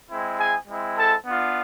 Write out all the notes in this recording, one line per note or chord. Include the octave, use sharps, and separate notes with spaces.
G#3 C4 E4
G#4 G#5
G#3 C4 E4
A4 A5
B3 D4 F4